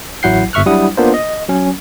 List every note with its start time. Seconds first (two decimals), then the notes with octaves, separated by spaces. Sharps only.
0.23 A1 F#3 E4 F#5 G6 C7
0.53 G1 E5 C#6 F6 F#6
0.66 F#3 G3 D4 E4 F#5 D#6
0.97 A#3 B3 D4 F4 A#4 C5
1.14 D#5
1.49 F#3 C#4